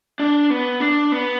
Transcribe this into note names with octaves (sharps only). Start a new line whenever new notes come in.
D4
B3
D4
B3